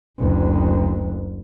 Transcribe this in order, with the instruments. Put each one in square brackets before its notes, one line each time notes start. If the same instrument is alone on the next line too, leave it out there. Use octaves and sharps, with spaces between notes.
[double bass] F#1 D2